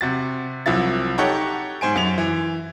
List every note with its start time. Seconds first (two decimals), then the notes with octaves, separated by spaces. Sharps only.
0.01 C3 F#4 A6
0.66 C2 F3 F#3 E4 A6
1.18 D#4 G4 A4 C#5 F#5
1.81 G#2 C5 G#5 D7
1.95 F#2 D7 F7
2.18 E3